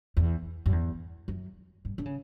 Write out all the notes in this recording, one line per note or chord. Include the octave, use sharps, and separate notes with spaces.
E2
F#2
E2
F#2
G2
D3
C#3